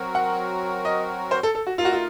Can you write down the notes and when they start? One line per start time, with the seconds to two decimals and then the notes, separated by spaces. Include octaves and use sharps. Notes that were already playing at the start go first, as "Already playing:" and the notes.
Already playing: F#3 C4 F#4 A#4
0.15 F#5
0.85 D#5
1.31 C5
1.43 A4
1.55 A4
1.67 F#4
1.78 A3 D#4 F4 A#4
1.85 F#4
1.93 F4